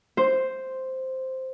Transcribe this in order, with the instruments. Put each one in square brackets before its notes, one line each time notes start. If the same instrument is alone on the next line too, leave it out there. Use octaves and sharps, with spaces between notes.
[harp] C5